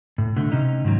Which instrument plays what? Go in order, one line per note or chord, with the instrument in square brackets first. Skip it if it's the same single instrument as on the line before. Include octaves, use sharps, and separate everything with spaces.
[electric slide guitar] A2
B2 D3 A3
C3 C#4 D#4 E4
G#2 D#3 F#3